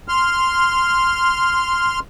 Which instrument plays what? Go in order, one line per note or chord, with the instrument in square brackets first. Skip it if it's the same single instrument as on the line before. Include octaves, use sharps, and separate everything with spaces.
[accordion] C6 F6